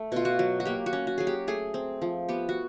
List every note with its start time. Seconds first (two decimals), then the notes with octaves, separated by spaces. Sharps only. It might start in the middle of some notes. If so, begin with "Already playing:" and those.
Already playing: A3
0.12 B2 F4
0.25 F#4
0.39 F#3
0.60 F#4
0.65 A#3 G4
0.86 F#4
0.93 C#4
1.07 F#4
1.18 F#3 G#4
1.27 G4
1.47 A3 G#4
1.74 C4
2.02 F3
2.29 B3 G4
2.49 F#4